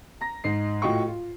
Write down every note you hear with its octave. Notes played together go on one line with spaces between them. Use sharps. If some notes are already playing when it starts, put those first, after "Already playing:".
A#5 A#6
G#2 D#4 C7
A2 F4 F#4 D#5 G5 C#6
F4